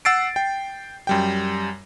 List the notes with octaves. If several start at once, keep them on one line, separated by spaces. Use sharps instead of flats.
F#5 E6 A6 C7 D7
G5
F#2 G3 G5